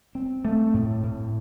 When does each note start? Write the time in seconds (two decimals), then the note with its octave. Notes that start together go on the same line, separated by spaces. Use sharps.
0.15 C4
0.45 A3
0.74 A2
1.03 A2